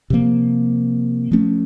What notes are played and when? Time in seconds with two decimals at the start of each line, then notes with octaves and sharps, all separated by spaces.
0.10 C3 F3 A#3
1.32 F3 A3 C#4